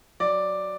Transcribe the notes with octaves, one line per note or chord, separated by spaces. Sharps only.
F#3 D5